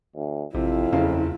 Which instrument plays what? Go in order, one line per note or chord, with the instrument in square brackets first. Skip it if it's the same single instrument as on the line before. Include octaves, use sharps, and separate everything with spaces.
[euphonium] D2
[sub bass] A1 [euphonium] F2 [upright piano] C3 [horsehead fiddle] E4 F4
[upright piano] F#1 C#3 F5 [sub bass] E2